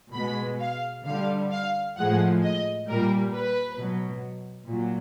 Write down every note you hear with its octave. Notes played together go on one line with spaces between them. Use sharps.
B2 G#3 B5
F5
D3 G3 F5
F5
A2 F3 G#3 F#5
D#5
A#2 G3 A#4
B4
B2 F#3
A#2 F#3